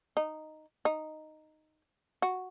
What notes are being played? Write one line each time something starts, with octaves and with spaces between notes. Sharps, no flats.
D#4
D#4
F#4